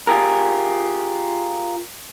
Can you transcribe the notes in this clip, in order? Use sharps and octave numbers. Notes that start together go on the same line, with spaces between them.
F4 G4 G#4 A#4